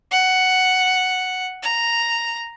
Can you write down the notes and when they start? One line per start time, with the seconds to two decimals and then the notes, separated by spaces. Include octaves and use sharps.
0.11 F#5
1.63 A#5